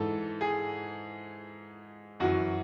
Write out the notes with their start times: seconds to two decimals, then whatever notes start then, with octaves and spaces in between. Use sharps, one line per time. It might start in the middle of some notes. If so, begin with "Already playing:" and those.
Already playing: G#2 E3 A4
0.41 G#4
2.20 F#2 E3 F#4